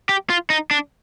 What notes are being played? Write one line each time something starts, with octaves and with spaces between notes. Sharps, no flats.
G4
F4
D#4
D4